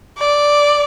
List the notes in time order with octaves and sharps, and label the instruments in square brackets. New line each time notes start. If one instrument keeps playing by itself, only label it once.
[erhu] D5